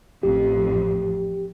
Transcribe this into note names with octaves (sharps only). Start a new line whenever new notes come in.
A1 F2 G4